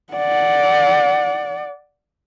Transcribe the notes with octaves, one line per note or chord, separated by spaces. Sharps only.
D5 F#5